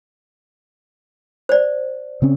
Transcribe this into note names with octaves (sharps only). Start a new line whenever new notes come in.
C5 D5
C#3 C4 C#4